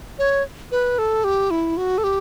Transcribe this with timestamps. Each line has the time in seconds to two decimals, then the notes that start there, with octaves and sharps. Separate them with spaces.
0.19 C#5
0.71 B4
0.98 A4
1.24 G4
1.51 E4
1.77 F#4
1.98 A4
2.04 G4